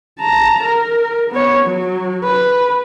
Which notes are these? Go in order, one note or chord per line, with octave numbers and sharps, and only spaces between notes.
A5 A#5
A#4
B3 C#5
F#3
B4